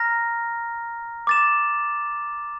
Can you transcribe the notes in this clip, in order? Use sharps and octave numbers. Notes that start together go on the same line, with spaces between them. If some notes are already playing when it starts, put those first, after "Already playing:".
Already playing: A#5 F6 A#6
D6 A6 E7